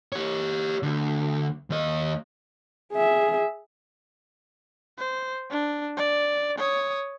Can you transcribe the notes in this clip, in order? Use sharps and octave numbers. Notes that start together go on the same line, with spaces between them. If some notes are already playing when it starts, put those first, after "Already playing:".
G4 C#5
D2 D3
D#2 D#5
G#4 E5
C5
D4
D5
C#5 D#6